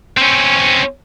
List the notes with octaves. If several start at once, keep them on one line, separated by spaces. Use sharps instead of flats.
C4 C#4